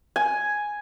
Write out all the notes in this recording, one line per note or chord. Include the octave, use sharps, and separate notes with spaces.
G#5